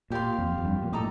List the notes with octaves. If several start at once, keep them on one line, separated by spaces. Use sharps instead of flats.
A#2 G4 D5 F5 C6
F2
F2
G2
A#2
A2 A4 D#5 A#5 D6